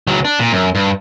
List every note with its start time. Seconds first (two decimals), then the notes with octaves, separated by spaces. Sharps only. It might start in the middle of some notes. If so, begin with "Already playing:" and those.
0.07 C#2 F#3
0.25 D4
0.39 A#2
0.52 F#2
0.75 G2